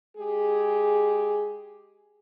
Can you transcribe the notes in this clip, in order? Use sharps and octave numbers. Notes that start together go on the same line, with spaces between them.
G#3 G4 G#4